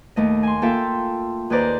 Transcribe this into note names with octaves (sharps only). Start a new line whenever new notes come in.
D#2 A3 D#5
G#5 C6
A#3 F4 A4 E5 G5 A5
D#2 G#4 B4 C5 D5 A#5